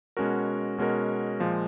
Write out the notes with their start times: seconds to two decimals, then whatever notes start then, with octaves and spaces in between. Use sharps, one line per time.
0.17 B2 G#3 C#4 F#4 A#4
0.78 B2 G#3 C#4 F#4 A#4
1.40 A#2 F3 G#3